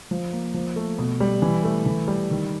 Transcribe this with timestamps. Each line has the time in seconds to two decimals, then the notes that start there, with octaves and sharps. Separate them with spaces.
0.11 F3
0.33 A#3
0.54 F3
0.76 A3
0.98 B2
1.20 G3
1.42 E3
1.64 A3
1.86 E3
2.08 G3
2.31 D#3